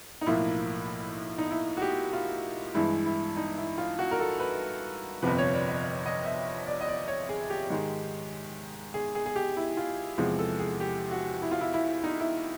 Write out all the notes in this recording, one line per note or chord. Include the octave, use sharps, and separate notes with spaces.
D#4
B1 A2 F3 A#3 E4
D#4
E4
F#4
G4
F4
G2 E3 G#3 E4
E4
D#4
E4
F4
F#4
A#4
A4
B4
G1 F2 C3 F3 B4
C#5
D5
D#5
D#5
E5
D5
D#5
D5
C#5
G#4
G4
G#2 D#3 G#3
G#4
G#4
G#4
G4
E4
F4
E2 C3 F3 G#3 G#4
A4
G#4
G4
F#4
E4
F4
E4
E4
D#4
E4